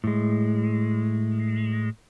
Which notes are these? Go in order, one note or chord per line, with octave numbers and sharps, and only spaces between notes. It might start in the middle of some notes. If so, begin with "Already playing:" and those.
A2 G#3